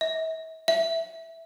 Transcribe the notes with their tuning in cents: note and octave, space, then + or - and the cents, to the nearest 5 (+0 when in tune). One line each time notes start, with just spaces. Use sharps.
E5 -40
E5 +0